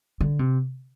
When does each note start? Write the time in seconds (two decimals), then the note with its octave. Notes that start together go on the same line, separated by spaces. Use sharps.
0.21 D3
0.39 C3